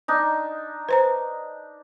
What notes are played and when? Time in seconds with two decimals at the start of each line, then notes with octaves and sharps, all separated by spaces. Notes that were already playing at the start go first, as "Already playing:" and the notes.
0.08 D4 D#4
0.89 B4 C5 A#5